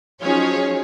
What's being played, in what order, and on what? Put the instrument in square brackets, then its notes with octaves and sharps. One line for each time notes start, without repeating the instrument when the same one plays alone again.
[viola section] F3 F#3 D#4 [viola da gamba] C#4 [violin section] G#4 C#5